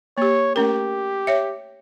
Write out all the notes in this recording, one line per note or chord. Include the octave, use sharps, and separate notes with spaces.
A#3 G4 C#5
A3 C#4 G4 A#4
C#5 E5